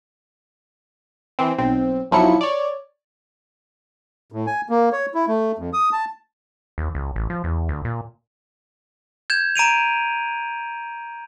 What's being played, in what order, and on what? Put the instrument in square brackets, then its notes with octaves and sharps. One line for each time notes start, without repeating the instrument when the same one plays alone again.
[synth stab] E3 C4
B1 C4
B1 F3 F#3 E4 C#7
C#5 D5
[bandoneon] A2
G#5
A#3
C#5
E4
A3
F2
D#6
A5
[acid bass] D#2
C#2
A1
F3
E2
D2
A#2
[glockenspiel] G6 G#6 E7
A#5 D7 D#7 F7